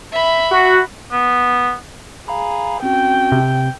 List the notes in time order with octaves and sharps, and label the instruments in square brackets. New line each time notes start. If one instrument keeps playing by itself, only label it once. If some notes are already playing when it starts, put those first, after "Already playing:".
[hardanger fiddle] E5 B5
[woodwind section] F#4
[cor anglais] B3
[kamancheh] G#4 [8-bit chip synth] F5 A#5 B5
[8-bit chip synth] C4 C#4 F#4 [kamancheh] G5
[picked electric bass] C3